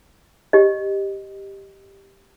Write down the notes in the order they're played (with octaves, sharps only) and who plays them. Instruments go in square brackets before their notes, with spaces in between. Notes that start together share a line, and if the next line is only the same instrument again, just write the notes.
[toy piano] G4 D#5